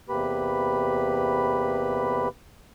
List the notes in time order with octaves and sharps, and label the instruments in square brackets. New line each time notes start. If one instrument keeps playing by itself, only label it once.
[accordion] E2 C3 A#3 G4 B4 B5